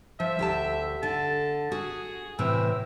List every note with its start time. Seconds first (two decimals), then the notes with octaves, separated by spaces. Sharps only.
0.20 F3 E5
0.39 D2 G4 A5
1.03 D3 A5
1.72 F#4 G#4
2.39 A2 C3 E3 E6